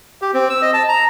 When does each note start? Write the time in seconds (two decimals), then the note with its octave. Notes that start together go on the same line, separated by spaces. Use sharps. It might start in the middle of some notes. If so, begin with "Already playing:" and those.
0.22 G4
0.34 C4
0.50 E6
0.62 D#5
0.74 A5
0.88 A#5